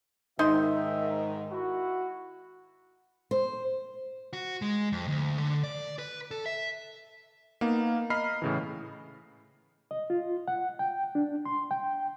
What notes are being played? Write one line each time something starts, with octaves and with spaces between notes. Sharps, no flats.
G#2 D#3 D#4 E5 C6
E4 F#4
C5
F#4
G#3
F2
D2
D3
D5
B4
A4
E5
A#3 B3 D#4 F5
D#5 A#5 B5 F6 C7
A2 C#3 E3
D#5
F4
F#5
G5
D4
C6
G5